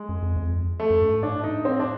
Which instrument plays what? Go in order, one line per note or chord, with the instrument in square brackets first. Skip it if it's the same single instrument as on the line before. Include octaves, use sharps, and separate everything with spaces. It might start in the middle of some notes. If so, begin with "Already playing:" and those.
Already playing: [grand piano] G#3
[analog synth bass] F#2
F2
F#2
F2
[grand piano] A3
[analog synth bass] F#2
G2
G#2
[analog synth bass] A2 [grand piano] D4
[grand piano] D#4
C4
D4